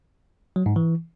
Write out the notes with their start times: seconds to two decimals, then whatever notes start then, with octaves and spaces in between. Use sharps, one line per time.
0.56 F#3
0.66 G#2
0.76 E3